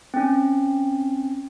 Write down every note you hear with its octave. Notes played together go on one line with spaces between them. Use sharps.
C4 C#4